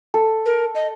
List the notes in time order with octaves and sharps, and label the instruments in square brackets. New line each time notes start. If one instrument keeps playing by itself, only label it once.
[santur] A4
[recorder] A#4
D#5